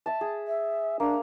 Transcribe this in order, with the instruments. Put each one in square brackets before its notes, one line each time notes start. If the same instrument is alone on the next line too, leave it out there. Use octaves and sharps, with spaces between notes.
[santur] E5 A5
G#4
[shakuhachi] E5
[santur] A#3 [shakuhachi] D4